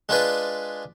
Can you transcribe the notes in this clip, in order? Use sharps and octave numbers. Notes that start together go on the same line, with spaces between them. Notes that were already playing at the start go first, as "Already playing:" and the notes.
G#3 D4 F4 G#4 B4 D5